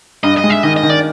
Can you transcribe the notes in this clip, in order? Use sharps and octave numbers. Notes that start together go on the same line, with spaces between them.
G2 D#5
D#5
G#3
E5
D#3 D#5
D#5
D#3
D5